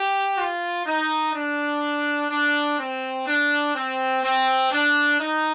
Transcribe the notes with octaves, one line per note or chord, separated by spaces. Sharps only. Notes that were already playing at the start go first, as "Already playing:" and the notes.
Already playing: G4
F4
D#4
D4
D4
C4
D4
C4
C4
D4
D#4